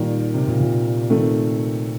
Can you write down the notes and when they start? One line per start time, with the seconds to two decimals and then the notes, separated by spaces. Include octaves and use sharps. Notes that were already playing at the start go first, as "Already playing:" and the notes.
Already playing: A#2 D#3 G3 A#3
0.34 C3
0.47 A#2
0.60 A#2
1.10 D#3 A3 C4